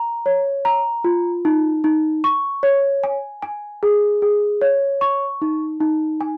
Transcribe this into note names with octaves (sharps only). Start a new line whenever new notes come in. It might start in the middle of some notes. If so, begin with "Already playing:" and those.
Already playing: A#5
C#5
A#5
F4
D#4
D#4
C#6
C#5
G#5
G#5
G#4
G#4
C#5
C#6
D#4
D#4
G#5